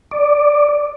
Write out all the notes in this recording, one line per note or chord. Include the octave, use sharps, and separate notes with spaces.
D5